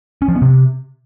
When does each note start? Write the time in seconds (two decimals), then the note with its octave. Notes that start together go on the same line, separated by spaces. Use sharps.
0.22 C#4
0.28 F3
0.35 B3
0.42 C3